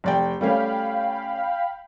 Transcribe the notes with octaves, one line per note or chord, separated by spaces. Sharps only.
F1 D5 G5
G3 A3 C#4 F5 G5 B5